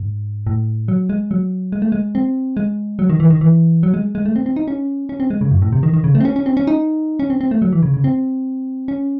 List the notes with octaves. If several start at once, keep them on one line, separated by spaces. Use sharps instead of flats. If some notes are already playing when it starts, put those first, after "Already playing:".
Already playing: G#2
A2
F#3
G#3
F#3
G#3
A3
G#3
C4
G#3
F#3
D#3
E3
D#3
E3
F#3
G#3
G#3
A3
C4
C4
D#4
C#4
C#4
C4
G#3
C#3
F#2
A2
C3
D#3
D#3
C#3
A3
C4
C#4
C#4
C4
C#4
D#4
C#4
C4
C4
A3
F#3
E3
C#3
C#3
C4
C#4